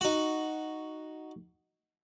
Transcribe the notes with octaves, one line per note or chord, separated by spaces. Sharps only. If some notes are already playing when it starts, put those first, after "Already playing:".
D#4 F#4